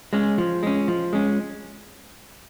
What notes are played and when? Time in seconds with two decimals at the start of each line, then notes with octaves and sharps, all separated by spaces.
0.13 G#3 C#4
0.38 F3
0.63 G#3 C#4
0.88 F3
1.13 G#3 C#4